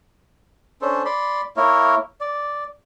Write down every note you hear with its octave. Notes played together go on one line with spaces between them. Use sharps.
C#4 D4 A4 C5
D5 B5 C6
A#3 E4 A#4 C#5
D5